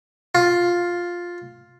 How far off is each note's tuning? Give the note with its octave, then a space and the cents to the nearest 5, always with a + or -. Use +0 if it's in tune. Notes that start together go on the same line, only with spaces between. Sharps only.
F4 +5